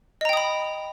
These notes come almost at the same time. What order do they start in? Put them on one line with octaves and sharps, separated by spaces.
D#5 A#5 G5 D#6 B5